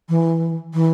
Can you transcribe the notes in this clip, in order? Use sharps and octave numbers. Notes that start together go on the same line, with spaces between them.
E3
E3